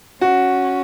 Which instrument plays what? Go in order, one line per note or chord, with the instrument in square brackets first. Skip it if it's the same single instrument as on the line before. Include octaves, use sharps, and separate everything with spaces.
[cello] C#4 [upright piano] F#4